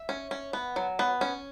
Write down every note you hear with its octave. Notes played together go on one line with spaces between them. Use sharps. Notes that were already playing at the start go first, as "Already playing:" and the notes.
Already playing: E5
C#4
C#4
B3
F#3
B3
C#4